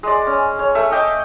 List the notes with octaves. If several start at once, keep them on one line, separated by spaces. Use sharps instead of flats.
G#3 D5
C#4
C#5
A3 E5
D#5 G5 D6